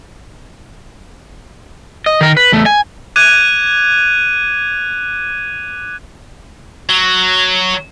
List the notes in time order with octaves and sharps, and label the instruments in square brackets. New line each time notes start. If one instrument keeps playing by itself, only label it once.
[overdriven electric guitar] D#5
D#3 A#4
B4
E2 A3
G#5
[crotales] D6 F#6 G#6 D#7 F7
[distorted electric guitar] F#3